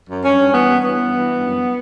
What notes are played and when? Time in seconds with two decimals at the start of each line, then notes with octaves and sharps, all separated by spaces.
0.09 F#2
0.24 G2 C#4
0.40 G2
0.54 E3 B3
0.69 G2
0.84 E3 B3
0.99 G2
1.15 E3
1.30 G2
1.45 F#2